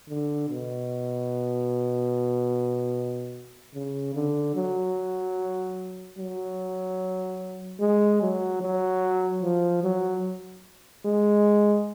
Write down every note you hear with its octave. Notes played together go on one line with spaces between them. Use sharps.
D3
B2
C#3
D3
F#3
F#3
G#3
F#3
F#3
F3
F#3
G#3